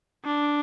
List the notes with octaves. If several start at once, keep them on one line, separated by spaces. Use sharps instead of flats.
D4